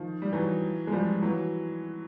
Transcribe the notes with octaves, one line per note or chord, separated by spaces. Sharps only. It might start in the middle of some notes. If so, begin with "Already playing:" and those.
Already playing: D#3 F3
G3
E3 F#3
G#3
F3 G3
E3 F#3